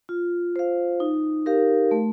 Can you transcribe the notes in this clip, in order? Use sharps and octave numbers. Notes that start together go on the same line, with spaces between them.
F4
C5 F5
D#4
G4 A#4 F5
A3